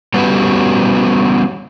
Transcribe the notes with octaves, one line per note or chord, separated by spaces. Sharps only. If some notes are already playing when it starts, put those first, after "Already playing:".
G3 B3 C#4 F#4 G4 B4